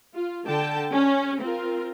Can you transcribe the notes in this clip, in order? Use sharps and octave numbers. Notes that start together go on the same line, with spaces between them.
F4
D3 G5 A5
C#4
C4 F4 A#4